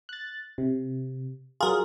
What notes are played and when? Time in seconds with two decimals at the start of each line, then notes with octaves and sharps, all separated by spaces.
0.09 F#6 A6
0.58 C3
1.61 F#3 F4 G#4 A#4